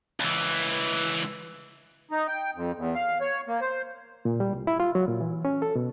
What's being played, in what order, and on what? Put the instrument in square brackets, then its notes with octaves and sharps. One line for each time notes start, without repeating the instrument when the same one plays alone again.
[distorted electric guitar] C#2 E3
[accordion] D#4
G5
F2
E2
F5
C#5
A#3
C5
[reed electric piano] A#2
G3
C2
E4
F4
F#3
A#2
E3
C#4
A4
B2